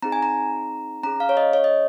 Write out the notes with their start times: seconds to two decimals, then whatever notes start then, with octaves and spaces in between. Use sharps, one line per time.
0.02 C4 D#4 G#4 A#5
0.12 G#5
0.22 A#5
1.03 C#4 G#4 A#5
1.20 F5
1.29 C#5
1.37 D#5
1.53 C#5
1.64 D#5